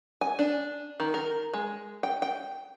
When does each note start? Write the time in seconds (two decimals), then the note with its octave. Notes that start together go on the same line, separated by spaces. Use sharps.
0.21 G#5
0.39 D4
1.00 D#3
1.14 A#4
1.53 G#3
2.03 G5
2.22 G5